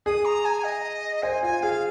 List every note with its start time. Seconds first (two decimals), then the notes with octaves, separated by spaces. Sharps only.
0.06 G#4 D#6
0.25 A#5
0.45 G#5
0.64 D#5
1.23 C5 G#5
1.43 F4 G#5
1.63 G#4 F5